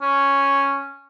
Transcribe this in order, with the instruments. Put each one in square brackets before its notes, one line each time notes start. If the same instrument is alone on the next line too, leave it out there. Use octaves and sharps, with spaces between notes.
[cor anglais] C#4